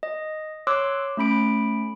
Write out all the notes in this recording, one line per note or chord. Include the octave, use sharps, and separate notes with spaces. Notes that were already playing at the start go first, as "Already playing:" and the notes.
D#5
C#5 C6 D6 E6 F#6
A3 C#4 B5 D7